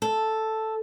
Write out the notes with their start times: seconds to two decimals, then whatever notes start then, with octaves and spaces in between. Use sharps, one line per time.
0.02 A4